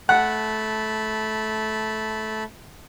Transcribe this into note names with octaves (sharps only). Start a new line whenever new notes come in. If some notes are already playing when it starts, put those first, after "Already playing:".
A3 F#5 A5 B5